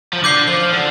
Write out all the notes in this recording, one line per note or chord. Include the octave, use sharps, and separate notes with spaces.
F3
D3 D6 G6 C7 G7
F3
D3